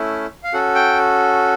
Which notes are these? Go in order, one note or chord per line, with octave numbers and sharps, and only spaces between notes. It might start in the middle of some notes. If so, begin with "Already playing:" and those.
Already playing: A3 C#4 E4
F5
C#4 F#4 A4 F#5
G5